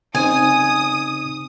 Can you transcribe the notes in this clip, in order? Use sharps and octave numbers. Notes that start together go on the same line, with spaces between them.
C#3 C4 D#4 G#5 D#6